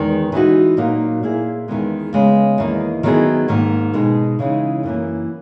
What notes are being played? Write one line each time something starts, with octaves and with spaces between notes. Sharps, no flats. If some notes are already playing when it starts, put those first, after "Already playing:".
Already playing: E2 D#3 G#3
E3 G#3 D#4 F#4
A#2 F#3 A#3 D#4
A#2 A#3 E4 G#4
E2 D#3 G#3 B3
C#3 G#3 B3
E2 D#3 A#3
D#3 F#3 B3 E4 G#4
G#2 D#3 A#3
B2 G#3 D#4 G#4
C#3 E3 G#3 D#4
F#2 E3 A#3